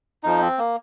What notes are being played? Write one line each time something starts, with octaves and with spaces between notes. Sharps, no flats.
F2 F3 D#4
C4
A#3